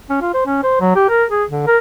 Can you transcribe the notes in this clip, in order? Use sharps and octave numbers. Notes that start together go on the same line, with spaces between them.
C#4
F4
C5
C#4
C5
F#3
G4
A#4
G#4
D3
A#4